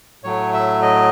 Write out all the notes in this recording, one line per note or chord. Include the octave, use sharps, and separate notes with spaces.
A2 F#3 A3 C#5
E5
D#5